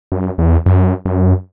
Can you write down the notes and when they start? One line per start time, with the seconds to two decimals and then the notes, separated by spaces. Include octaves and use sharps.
0.12 F#2
0.38 E2
0.66 F#2
1.05 F#2